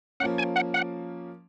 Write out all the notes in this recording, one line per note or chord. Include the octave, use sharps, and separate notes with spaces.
F3 A#3 C#4 F#5
G#5
F#5
F#5